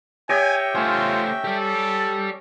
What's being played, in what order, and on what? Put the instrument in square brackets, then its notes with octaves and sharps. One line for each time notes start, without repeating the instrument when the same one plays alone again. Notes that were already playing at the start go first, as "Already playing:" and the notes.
[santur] G4 C#5 D#5 [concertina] E5 G5 [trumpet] G#5
[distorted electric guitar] A3 C5 [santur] C#4 [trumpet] F4
[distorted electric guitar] G4 D5 [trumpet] A4